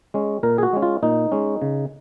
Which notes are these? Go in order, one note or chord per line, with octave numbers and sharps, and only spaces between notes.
G#3 C#4
A#2 A#4
G#4
F#4
G#3 C#4
F4
A#2 D#4
G#3 C#4
C#3